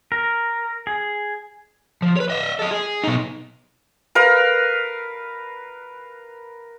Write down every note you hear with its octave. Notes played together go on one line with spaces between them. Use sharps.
A#4
G#4
F3
B4 C#5
D#5 E5
A4 D#5
G#4
B2 D#4
A#4 B4 F5